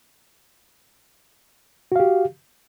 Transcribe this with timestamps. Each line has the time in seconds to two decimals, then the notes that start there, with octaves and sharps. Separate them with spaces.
1.92 F#4
1.96 F5
2.00 G4